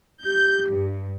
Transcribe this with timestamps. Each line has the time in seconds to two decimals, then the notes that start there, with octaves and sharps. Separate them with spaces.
0.25 G4 G6
0.68 G2